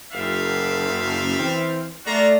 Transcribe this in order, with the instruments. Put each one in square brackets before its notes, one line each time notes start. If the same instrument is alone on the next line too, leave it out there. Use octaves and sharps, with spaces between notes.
[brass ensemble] F#1 [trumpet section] G3 E5 F5
[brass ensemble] E3 C4
[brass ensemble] A3 D5 [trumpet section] F4 F#4 A#5